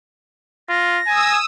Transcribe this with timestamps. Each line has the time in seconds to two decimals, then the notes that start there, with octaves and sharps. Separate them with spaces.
0.69 F4 A#6
1.07 G#5 D#6 E6